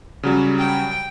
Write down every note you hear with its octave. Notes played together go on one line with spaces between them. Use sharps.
C#3 F#3 G3
G5